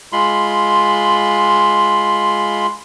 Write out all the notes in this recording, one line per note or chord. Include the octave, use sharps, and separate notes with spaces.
G#3 F4 B5 C6